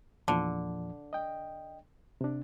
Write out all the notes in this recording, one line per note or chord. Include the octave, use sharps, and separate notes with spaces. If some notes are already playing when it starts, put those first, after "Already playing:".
E2 A#2 D3 F3
D#5 G5
C3 D4